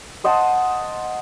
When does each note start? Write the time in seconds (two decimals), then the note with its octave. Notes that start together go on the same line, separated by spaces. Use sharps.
0.24 C5 D#5 F#5 A5